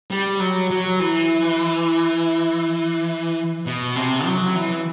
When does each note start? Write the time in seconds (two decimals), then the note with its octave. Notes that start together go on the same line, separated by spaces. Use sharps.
0.11 G3
0.40 F#3
0.71 F#3
1.00 E3
3.66 B2
3.96 C3
4.25 F#3
4.55 E3